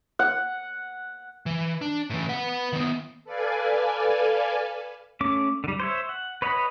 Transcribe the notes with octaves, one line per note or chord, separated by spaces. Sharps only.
F#5
E3
D4
A2 E3
B4 F#5
D#3 B3
A4 B4 D5 F5 G#5
A3 C#4 D6
D3 G3
C5 C#5 E5
F#5
B4 C#5 D#5 F#5 B5